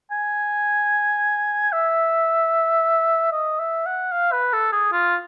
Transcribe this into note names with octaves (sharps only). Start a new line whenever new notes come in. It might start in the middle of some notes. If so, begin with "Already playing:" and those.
G#5
E5
D#5
E5
F#5
F5
B4
A4
G#4
F4